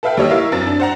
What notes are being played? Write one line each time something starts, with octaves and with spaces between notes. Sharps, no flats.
A4 B4 E5 F5 G5
D#2 G3 C#5 D#5 E6
E4 A#4 E5 F5 C#6
F#2 C4 A6
D4
C5 F#5 A#5